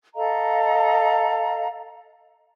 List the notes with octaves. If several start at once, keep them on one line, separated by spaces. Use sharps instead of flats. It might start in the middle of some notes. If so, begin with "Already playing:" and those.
A4 D#5 F5 A#5